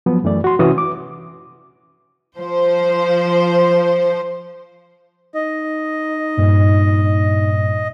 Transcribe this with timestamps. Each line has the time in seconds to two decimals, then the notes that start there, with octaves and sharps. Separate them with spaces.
0.06 F3 F#3 B3
0.24 F#2 E3 A3 D5
0.44 F#4 C6
0.59 C3 E3 C#4 F#4 D#6
0.78 D6
2.37 F3 C5
5.35 D#4 D#5
6.37 G2 A#2